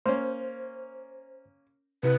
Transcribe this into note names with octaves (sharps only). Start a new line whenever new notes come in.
A#3 C#4 C5
C3 E4 B4